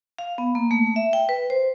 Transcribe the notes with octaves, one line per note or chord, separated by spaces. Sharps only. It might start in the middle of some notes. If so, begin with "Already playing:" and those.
F5
B3
A#3
A3
E5
G5
B4
C5